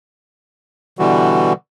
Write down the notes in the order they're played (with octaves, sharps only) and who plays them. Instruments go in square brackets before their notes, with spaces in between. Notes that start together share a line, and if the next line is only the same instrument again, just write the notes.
[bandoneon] B2 D3 E3 G3 F#4